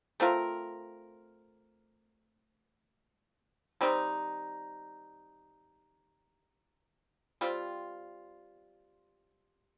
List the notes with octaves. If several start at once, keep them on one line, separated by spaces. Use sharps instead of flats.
A3 C4 F4 A#4
D#3 G3 C4 D#4
G3 C4 F4